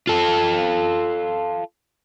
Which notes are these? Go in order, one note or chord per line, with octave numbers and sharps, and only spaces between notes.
F4 A4